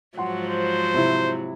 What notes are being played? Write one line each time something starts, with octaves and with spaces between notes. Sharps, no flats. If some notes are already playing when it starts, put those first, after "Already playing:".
G#2 F3 F#3 F#5 C6
C5
C3 E4